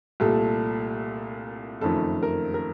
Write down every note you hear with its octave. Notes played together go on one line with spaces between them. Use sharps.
C2 A#2 A3 A4
F#1 F2 D#3 A3 A4
A#4
A#4